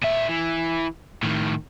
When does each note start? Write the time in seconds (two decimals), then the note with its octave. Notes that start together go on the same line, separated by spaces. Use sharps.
0.03 A#2 E5
0.29 E3
1.23 A2 D#3